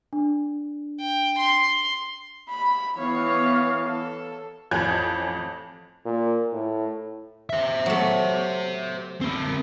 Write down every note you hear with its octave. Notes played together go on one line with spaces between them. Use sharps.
D4
G5
C6
B5
E3 B3 C#5 F5
A4
A1 F2 G#5 G6 G#6
A#2
A2
C5 E5
F#3 A3
C4 A#4